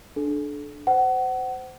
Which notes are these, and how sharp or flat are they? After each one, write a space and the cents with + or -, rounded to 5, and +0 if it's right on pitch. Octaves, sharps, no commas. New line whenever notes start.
D4 +0 A4 -35
C5 -20 F#5 +25